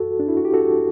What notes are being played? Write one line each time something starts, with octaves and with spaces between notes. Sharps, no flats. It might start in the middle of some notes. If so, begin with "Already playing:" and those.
Already playing: F#4 A4
D4
E4
F#4
G4
F#4 A4